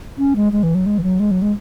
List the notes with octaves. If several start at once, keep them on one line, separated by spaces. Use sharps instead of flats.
C#4
G#3
G#3
E3
F#3
G#3
E3
F#3
G#3
F#3
G#3